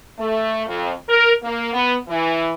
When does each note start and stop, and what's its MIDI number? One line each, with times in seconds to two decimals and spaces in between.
0.19 0.65 57
0.67 0.92 41
1.08 1.31 70
1.43 1.72 58
1.72 1.95 59
2.08 2.52 52